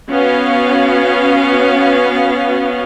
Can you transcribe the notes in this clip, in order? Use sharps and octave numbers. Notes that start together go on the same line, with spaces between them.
B3 C#4 F#4 F5